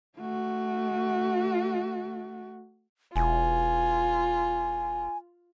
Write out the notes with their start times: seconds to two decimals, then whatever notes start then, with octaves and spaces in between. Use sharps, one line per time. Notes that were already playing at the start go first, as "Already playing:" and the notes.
0.17 A3 F#4
3.16 E1 F4 G#5